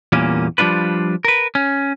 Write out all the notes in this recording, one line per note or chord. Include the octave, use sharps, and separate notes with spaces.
E2 A#2 G3 A#3 C#4
F3 G3 D4 F4 B4
A#4 B4
C#4